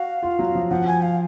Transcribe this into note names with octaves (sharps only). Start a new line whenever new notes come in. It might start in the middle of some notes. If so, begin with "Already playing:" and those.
Already playing: F#4 F5
F4
F#3
F3
F3 F#5
G#5
F5